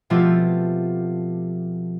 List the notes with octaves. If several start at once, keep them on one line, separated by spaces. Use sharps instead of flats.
B2 F3 A3 C4 F4 G4